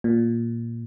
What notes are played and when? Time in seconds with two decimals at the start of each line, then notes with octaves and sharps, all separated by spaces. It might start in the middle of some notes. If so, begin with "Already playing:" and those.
0.04 A#2